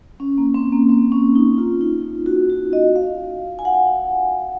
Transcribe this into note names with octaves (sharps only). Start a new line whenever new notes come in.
C#4
A#3
C4
A#3
C4
C#4
D#4
F4
D#4
F4
F#4
F#4
D#5
F5
G#5
F#5